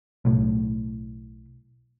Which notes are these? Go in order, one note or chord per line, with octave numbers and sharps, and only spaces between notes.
B1 A2